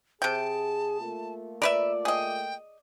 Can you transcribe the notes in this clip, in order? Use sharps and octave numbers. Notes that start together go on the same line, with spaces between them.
C3 G#4 G5 A5
A3 A#3 F4
A#4 B4 D5 E5
G#4 D#5 G5